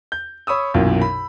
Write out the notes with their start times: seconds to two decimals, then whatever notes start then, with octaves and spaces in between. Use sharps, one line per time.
0.12 G6
0.47 C#5 B5 C#6 D#6 E6
0.74 B1 F#2 A#2 E3
1.01 B5